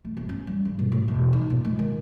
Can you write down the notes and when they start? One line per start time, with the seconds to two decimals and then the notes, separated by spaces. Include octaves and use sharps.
0.05 A3
0.17 G1
0.29 C#4
0.47 G3
0.65 G2
0.79 A#2
0.92 A2
1.08 E1
1.33 D#4
1.50 A#2
1.65 G#3
1.79 D#3